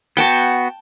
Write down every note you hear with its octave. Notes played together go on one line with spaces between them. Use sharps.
B3 F#4 G5 A5